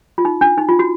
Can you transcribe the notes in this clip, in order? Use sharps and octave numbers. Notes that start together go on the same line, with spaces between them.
F4
D#4
D4
D#4
F4
F#4